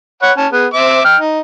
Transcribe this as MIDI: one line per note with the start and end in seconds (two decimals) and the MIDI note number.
0.23 0.32 73
0.23 0.32 78
0.23 0.32 83
0.37 0.47 61
0.37 0.47 81
0.53 0.67 59
0.53 0.67 68
0.74 1.00 60
0.74 1.00 76
0.74 1.00 86
1.05 1.17 79
1.05 1.17 89
1.19 1.40 63